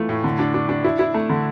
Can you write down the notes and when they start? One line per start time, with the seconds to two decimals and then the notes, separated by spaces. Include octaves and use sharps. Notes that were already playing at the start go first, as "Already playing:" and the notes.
Already playing: E3 A3 F4
0.09 A2
0.24 D3
0.39 D4
0.54 D4
0.69 D4
0.84 E4
0.99 E4
1.14 A3
1.29 D3